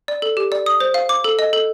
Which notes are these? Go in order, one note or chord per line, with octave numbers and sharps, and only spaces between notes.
D5
A4
G4
D5
D#6
C5
F5
D6
A4
D#5
A4